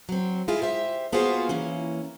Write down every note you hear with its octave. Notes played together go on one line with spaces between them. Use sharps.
F#3 C4
G#3 E4 F4 G#4
G4 C5 E5
A#3 B3 F4 F#4 G#4 C5
E3 A#3 C#4